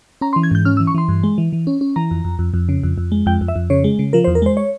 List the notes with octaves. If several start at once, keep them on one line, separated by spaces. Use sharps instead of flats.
C#4 A#5
C6
E3
G#6
G#2 G6
C#4 F6
E6
E3
C#6
E3 C6
G2
G#3
E3
E3
C#4
C#4
E3 A#5
F2
F2
F2
F2
C#3
F2
F2
G#3
F2 G5
F2
E5
F2
C#3 C#5
G#3
C#3
F3 A#4
C5
E2
A#4
G#3 C5
C#5